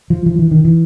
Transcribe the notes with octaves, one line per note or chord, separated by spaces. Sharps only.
F3
F3
E3
D#3
E3